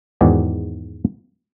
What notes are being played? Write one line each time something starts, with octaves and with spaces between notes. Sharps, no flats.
E2 G#2 D#3 F#4 G#4 D5